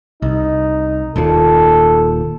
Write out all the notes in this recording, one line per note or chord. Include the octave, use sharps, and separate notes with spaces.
C2 D#4
D#1 D#2 A#2 A4